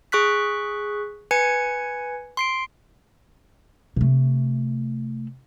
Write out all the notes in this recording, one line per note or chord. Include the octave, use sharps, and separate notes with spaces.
G#4 C#6 F#6 B6
B4 G#5 G#6 C#7
C6 C7 D7
C3 A3